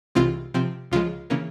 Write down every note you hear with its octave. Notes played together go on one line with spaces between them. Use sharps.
C2 C3 E3 G#3 C4 F4
C3 F3 C4
C#2 C#3 F3 G#3 F4
C#3 E3 A#3 C#4